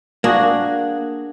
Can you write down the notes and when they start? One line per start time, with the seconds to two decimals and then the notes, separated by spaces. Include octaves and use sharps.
0.24 A#3 D4 F#4 G#4